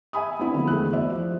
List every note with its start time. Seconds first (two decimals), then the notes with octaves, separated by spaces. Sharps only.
0.13 E5 G#5 B5 D#6
0.39 B3 C4 D4 E4 B5
0.54 D3 F3 F#3 A#3
0.67 E2 G#3 A3 E4 F#6
0.93 F#4 C5 D5 E5
1.12 F3